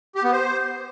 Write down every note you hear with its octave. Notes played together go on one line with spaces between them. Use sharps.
G4
B3
C5